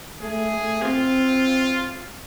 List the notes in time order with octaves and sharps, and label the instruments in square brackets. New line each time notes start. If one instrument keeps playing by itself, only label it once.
[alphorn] A3 [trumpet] G#4
[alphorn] A3
[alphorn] C4 [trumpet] F4